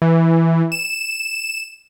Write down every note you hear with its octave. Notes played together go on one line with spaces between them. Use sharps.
E3
E7